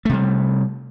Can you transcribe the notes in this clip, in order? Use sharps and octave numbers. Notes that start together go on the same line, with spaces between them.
C3 G3 A3